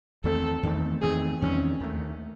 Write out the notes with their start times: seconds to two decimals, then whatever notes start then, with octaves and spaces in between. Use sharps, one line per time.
0.24 E2 D#3 A3 C4 A4
0.63 E2 D#3 A3 C4
1.02 E2 D#3 A3 C4 G#4
1.42 E2 D#3 A3 C4 C#4
1.80 D#2 D#3 A3